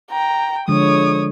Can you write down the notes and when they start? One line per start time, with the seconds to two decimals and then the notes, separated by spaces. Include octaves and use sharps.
0.11 G5 A#5
0.68 D3 F3 G#3 C#5 D#6